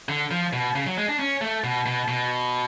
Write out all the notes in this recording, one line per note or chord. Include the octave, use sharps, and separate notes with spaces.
D3
F3
B2
C#3
F#3
G#3
D4
C#4
A3
B2
B2
B2